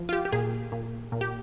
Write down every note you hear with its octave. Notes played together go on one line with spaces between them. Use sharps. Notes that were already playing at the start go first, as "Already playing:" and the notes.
Already playing: F3
F4
G4
G4
A#2 G#4
A#2
A#2
G4